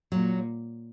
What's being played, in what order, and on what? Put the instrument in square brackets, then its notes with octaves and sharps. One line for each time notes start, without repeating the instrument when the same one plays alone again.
[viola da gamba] A#2 [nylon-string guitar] F#3